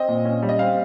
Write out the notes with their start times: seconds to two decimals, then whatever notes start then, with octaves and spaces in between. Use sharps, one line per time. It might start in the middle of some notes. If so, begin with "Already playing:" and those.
Already playing: C4 D#5
0.08 A#2
0.25 C#4
0.42 G3
0.49 D#5
0.59 C4 F5